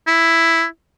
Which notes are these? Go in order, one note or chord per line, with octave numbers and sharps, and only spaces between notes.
E4